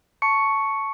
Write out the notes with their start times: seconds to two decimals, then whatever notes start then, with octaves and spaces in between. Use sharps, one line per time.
0.22 A5 C#6 C#7